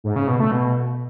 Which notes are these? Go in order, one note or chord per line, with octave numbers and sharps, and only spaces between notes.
G#2
C#3
B2
A3
B2